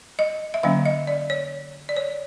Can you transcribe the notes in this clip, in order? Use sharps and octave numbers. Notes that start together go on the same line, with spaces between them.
D#5
E5
D3 F#3 A#3 C#4 F5
D#5
D5
C#5
D5
C#5